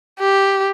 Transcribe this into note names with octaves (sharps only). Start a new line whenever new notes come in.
G4